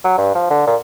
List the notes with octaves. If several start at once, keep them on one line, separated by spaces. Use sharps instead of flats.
F#3
G2
F3
D3
A#2